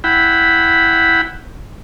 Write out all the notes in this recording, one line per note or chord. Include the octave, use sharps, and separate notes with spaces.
E4 F#5 G5 B5